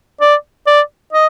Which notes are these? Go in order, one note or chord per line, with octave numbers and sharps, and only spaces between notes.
D5
D5
D#5